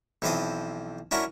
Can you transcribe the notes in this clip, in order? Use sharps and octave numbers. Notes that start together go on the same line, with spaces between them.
B1 E3 F3 C4 C5 D#6
C#4 D4 E4 F#4 A#4